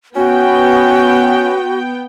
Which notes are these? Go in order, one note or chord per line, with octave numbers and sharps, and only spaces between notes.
B3 C#4 F#4 G5